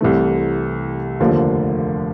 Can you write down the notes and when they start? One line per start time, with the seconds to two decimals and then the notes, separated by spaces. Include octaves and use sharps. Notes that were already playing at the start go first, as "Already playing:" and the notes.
0.01 C2 C3 E3 A3
1.20 F1 D#2 D3 F3 A#3